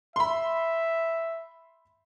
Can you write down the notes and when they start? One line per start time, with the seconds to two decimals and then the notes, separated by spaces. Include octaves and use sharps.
0.16 E5 B5 C6